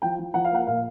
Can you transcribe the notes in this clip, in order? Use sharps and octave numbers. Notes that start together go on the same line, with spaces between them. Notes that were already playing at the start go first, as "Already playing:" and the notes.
F3 G5
F3
F3 F#5
F5
A#3 F#5
A#2 F5